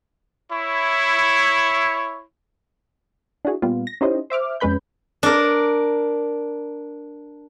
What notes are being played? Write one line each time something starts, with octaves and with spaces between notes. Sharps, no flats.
E4 C#5
D4 E4 F#4 G#4
A#2 G3 B3 F4
A#6
C#4 D#4 E4 G4 C5 D#5
C5 E5 D6 F6
F2 G#3 C#4 B4 B5 G6
D4 A#4